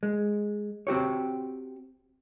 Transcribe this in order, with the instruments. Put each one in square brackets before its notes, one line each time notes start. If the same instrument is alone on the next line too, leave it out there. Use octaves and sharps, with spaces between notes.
[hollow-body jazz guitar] G#3
C4 F#4 G4 C#5